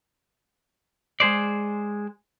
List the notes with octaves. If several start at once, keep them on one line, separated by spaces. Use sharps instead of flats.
G#3 G#4 C5 D5